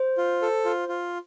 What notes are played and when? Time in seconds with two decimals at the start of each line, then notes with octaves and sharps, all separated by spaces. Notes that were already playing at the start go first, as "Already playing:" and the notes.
Already playing: C5
0.17 F4
0.42 A4
0.65 F4
0.88 F4